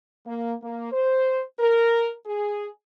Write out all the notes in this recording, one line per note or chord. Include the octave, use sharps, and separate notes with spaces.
A#3
A#3
C5
A#4
G#4